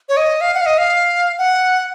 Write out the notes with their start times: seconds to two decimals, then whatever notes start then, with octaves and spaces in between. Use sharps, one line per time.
0.09 C#5
0.17 D#5
0.41 F5
0.54 F#5
0.61 F5
0.66 D#5
0.78 F5
1.38 F#5